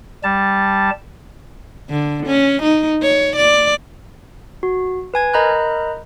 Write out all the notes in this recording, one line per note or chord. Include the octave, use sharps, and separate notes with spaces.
G3 A5
D3
C#4
D#4
C#5
D5
F#4
B4 G#5 G#6
A#4 D#5 A#5 B5 F#6 G6